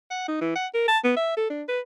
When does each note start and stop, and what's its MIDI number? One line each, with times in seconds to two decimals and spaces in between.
0.11 0.24 78
0.28 0.38 63
0.41 0.53 52
0.56 0.67 78
0.74 0.87 70
0.88 0.98 81
1.04 1.13 59
1.17 1.32 76
1.37 1.48 69
1.50 1.63 62
1.68 1.80 71